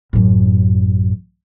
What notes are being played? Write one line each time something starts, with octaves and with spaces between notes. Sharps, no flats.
A1 F#2